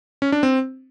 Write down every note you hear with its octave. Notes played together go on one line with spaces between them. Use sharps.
C#4
D4
C4